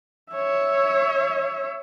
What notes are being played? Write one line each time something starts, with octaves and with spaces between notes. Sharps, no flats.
C#5 E5